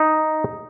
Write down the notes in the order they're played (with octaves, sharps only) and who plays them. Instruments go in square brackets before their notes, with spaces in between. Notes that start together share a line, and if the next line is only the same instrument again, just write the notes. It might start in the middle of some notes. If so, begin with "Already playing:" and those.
Already playing: [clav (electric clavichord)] D#4